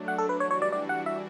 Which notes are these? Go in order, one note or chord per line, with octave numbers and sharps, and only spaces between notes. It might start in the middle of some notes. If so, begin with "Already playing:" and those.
Already playing: F#3 A3 D4
F#5
A4
B4
E3 G3 D4 F#4 C#5
C#5
D5
D5
F#5
E5